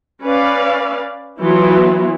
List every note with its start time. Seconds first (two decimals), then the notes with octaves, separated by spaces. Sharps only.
0.23 C#4 B4 D5 F5
1.41 E3 F#3 B3 E4 F4